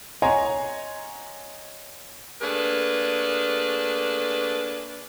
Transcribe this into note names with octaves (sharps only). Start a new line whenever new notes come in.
C#5 D#5 F#5 G#5 A#5 C6
A3 A#3 D4 G#4 B4